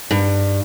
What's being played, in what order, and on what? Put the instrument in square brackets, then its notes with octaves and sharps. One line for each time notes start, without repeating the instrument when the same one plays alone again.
[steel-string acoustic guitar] G2